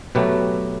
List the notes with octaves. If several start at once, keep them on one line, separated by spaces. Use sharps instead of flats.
B2 F#3 A3 G4 B4